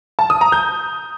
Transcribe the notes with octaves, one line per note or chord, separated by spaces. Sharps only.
A5
D#6
A#5
G6